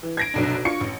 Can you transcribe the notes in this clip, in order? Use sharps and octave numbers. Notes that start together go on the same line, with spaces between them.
E3
G#6 A#6 D7
F1 B1 D4
D4 F4 C#6 C#7
A1